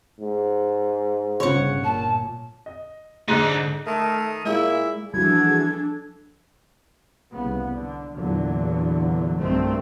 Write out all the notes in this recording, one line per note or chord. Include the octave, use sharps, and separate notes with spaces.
G#2
G1 C#3 C#5 F#5
A#2 A5
D#5
G#2 D3 D#4 D5 D#5 F#6 D#7
D#3 A3
A#2 G#3 E4 G#4
E3 F3 G3 D4 F#4 G#4 A4 G#6
C2 C#3 B3
D3
E2 A#2 D3 E3 F#3
F#1 B1 G2 D#3 A3 C4